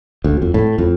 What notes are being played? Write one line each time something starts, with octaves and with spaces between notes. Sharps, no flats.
D2
F2
A2
F2